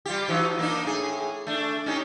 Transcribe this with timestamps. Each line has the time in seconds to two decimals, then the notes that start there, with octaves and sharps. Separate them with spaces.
0.06 G3 F4 G4
0.28 E3 F#3 D#4
0.59 A#3 D4 D#4
0.85 A2 G#4
1.47 A3 D4
1.86 C#4 D#4 G4